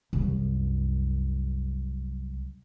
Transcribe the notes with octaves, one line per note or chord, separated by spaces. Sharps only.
C2 F#2